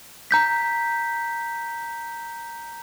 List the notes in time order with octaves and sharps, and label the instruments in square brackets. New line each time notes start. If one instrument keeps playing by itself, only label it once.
[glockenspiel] A#5 G6 B6